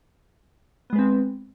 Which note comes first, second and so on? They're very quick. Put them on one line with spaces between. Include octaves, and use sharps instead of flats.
B3 G#3 B4 C4